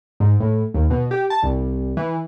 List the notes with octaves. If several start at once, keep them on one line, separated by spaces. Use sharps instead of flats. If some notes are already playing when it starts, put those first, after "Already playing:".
G#2
A2
D#2
B2
G4
A5
C2
E3